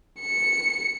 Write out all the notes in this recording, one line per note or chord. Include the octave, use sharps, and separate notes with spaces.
C#7